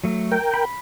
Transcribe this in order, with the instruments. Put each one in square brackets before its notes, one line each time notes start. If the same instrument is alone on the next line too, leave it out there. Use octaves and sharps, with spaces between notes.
[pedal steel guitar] F#3 A3
[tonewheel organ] A#4 G5
[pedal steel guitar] B5